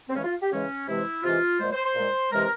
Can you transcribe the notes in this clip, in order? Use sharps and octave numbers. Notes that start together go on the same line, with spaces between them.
C4
C#3 E3 G#3 C#4
F4
G4
C#3 E3 G#3 C#4
C3 E3 G#3 E4
C3 E3 G#3 F4
A#2 G#3 C5
C5
C5
A#2 G#3
C3 E3 G#3 A#4